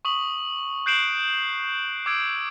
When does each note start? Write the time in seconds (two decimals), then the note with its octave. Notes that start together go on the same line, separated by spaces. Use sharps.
0.05 C#6 D#6 F#7
0.86 F#6 G6 C7 D7 E7 F#7
2.06 D6 E6 G#6 D7